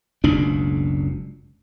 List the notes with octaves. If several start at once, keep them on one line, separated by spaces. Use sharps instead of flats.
F#1 C#2 B2 D4